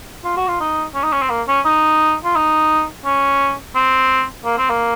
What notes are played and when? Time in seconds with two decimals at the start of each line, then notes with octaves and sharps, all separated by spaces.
0.24 F4
0.37 F#4
0.48 F4
0.60 D#4
0.94 C#4
1.03 D#4
1.12 C#4
1.22 C4
1.30 A#3
1.48 C#4
1.65 D#4
2.25 F4
2.36 D#4
3.05 C#4
3.75 C4
4.45 A#3
4.58 C4
4.70 A#3